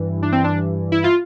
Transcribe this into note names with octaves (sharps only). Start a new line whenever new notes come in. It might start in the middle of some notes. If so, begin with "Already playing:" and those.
Already playing: G2 E3
D4
C4
D4
E4
F4